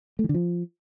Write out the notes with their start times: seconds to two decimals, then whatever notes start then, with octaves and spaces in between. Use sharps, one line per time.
0.19 A3
0.24 E3
0.29 D3
0.34 F3